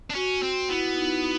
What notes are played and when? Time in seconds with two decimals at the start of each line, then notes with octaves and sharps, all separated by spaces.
0.10 D4
0.15 C#4 F#4
0.43 C4
0.69 B3 E4
0.96 D#4